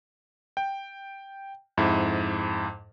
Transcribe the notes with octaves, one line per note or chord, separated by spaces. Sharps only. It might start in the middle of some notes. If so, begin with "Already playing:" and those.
G5
F2 G#2 E4